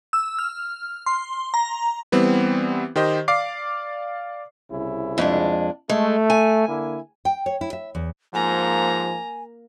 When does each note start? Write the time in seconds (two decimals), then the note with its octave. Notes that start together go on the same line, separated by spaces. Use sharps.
0.13 E6
0.39 F6
1.06 C6
1.54 A#5
2.12 E3 G3 B3 C4
2.96 D#3 G4 C5 D#5
3.28 D5 F5 D6 C7
4.71 C2 C#3 E4
5.18 F2 G#3 D4
5.89 G#3 A3
6.30 G#5
6.68 D3 A#3 E4
7.25 G5
7.46 C#5
7.61 E4
7.73 E5
7.95 E2
8.34 G#2 F3 A#3 G#5 A#5